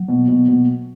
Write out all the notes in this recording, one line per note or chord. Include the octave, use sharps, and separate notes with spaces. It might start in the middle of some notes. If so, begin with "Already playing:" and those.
Already playing: F#3
B2
B2
B2